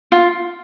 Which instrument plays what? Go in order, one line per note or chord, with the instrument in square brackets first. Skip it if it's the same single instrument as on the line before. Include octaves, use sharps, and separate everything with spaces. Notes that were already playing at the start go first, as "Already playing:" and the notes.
[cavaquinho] F4